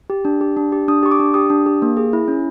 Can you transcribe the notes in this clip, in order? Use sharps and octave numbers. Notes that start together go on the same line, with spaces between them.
G4
D4
G4
D4
G4
D4 D#6
G4 C#6
D6
D4
G4 D#6
D4
G4
A#3
G#4
E4
C#4